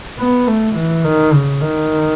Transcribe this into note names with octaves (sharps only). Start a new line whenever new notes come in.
B3
A3
E3
D#3
C#3
D#3